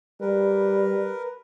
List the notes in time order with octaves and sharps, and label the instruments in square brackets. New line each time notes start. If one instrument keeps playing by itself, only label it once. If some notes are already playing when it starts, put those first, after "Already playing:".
[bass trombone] G3 [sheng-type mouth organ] A#4 B4